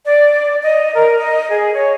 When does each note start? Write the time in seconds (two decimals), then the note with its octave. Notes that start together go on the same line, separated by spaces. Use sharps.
0.05 D5
0.62 D#5
0.94 A#4
1.17 D#5
1.49 G#4
1.73 C#5